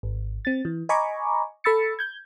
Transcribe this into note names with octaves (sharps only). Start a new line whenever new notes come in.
G#1
C4 A6
E3
D#5 G#5 A#5 B5 C#6 D6
A4 B5 E6 A6 C#7
G6 G#6